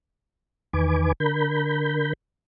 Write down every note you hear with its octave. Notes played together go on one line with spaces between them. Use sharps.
E2 D#3 B4 G#5 D6
D3 A#4 B5 G6